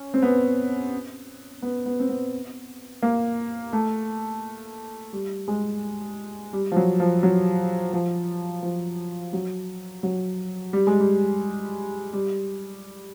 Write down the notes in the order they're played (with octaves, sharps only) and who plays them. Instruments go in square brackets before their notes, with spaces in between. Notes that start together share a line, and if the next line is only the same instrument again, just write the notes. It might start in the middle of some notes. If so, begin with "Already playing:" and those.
Already playing: [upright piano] C#4
C4
B3
B3
B3
C4
B3
A#3
A3
G3
G#3
G3
F3
F#3
F3
F#3
F3
F3
F#3
F#3
G3
G#3
G3
G3